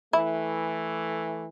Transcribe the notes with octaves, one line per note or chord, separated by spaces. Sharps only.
E3 A3 E4